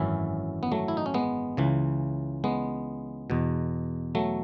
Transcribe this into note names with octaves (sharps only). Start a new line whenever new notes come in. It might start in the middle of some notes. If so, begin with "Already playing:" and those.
Already playing: G#1 F#2 E3 C#4 E4
B3
F#3 A3
E4
D#4
C#4
G#3 B3
C#2 C#3 E3
G#3 B3
E2 B2
F#3 A3